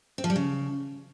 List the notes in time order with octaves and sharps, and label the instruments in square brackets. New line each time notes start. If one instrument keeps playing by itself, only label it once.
[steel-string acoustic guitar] C4
F3
G3
C#3